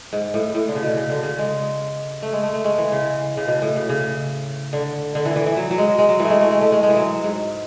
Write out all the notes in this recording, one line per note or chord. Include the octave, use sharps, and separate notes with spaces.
G#2
A2
A2
D3
C#3
B2
C#3
D3
C#3
G#3
A3
G#3
A3
A3
G#3
E3
C#3
C#3
B2
A2
C#3
C#3
D3
D3
E3
E3
E3
F#3
F#3
G#3
G#3
F#3
E3
A3
G#3
A3
G#3
A3
G#3
G#3
E3
F#3
G#2